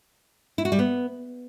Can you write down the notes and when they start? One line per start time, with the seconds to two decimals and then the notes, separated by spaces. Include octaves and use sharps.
0.58 E4
0.65 F#4
0.72 G3
0.79 B3